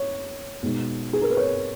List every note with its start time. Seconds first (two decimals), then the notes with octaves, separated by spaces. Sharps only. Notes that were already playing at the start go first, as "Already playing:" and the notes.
Already playing: C#5
0.63 B2 G#3 D#4
1.13 G#4
1.22 A#4
1.30 B4
1.37 C#5